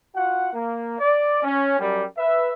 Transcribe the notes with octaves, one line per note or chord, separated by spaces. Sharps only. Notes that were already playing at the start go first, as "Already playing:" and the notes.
F4 F#4 F#5
A#3
D5
C#4
F#2 G3
B4 E5